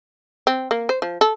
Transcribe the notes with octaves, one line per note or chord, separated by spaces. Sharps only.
C4
A#3
C5
F3
A4